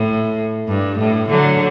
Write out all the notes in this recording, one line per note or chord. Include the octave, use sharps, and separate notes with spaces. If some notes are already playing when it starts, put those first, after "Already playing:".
Already playing: A2
G2
A2
D3 F#3